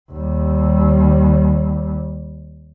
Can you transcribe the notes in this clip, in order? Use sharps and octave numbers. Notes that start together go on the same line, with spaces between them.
D#2 G3